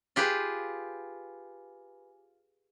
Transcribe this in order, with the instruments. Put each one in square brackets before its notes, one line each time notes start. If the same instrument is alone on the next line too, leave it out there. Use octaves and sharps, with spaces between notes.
[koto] F4 G4 G#4 B4